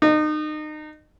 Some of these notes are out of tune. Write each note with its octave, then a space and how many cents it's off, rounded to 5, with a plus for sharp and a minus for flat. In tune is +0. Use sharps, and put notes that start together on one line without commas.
D#4 -30